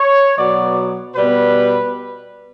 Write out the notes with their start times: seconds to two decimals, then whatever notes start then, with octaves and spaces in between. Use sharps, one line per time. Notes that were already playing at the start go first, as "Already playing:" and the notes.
Already playing: C#5
0.38 B2 F#3 B3 D5
1.16 B2 G3 B3 B4